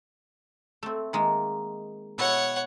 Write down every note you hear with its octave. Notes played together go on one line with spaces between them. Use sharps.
A3 C4
D#3 G#3 A#3
B2 E4 C#5 F#5